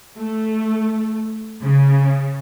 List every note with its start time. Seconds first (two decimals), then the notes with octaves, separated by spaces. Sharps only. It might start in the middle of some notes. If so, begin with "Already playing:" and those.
0.17 A3
1.62 C#3